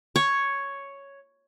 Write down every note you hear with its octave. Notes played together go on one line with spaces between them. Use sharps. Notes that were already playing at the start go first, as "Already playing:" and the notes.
C#5